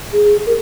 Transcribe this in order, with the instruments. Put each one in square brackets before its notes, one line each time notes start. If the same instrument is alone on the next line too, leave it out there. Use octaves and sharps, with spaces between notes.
[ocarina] G#4
A#4